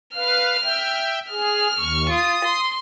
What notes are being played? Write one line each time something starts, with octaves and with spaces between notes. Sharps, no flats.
B4 F5 F6
E5 G5
G#4 F6
D#2 C#6
F4 D#6
C6